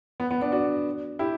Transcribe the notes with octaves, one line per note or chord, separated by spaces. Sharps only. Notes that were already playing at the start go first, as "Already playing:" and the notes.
B3
B3
B3 D4
D4 F#4
E4 G4